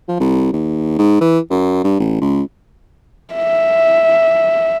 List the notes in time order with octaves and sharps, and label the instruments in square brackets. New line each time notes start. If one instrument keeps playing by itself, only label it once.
[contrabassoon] F3
C2
D#2
G#2
E3
F#2
G2
A1
C#2
[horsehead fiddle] E5